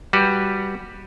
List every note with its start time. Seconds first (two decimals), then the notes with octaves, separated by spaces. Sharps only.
0.13 G3 F#4 G4 B4